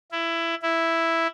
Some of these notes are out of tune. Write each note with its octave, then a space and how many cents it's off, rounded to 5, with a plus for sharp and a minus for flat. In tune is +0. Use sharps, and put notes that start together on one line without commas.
E4 +15
E4 +0